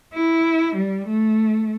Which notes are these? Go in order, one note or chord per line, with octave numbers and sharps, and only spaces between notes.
E4
G3
A3